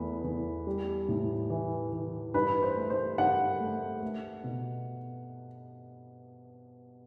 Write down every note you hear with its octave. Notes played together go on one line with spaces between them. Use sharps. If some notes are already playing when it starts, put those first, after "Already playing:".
Already playing: E2 A3 B4
E2
G3
A2
E3
E3
G2 B4
C5
A3
C5
G2 F#5
A3
A3
B2